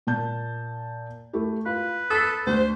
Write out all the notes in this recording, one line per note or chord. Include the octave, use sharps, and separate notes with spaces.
A#2 A5 G6
A3 E4 G4
F4 B4
A4 D#6 A6 B6
D2 C5